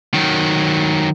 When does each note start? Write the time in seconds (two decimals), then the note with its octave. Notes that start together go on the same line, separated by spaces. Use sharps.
0.14 D#3 F#3